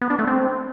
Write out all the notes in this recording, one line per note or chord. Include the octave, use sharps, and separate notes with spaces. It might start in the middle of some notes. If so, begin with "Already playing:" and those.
B3
D4
A3
C4